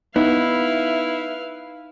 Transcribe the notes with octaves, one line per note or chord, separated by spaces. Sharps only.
B3 D#4 E4 B4 F5